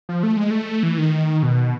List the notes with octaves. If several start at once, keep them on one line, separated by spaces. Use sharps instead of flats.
F3
A3
G#3
A3
E3
D#3
B2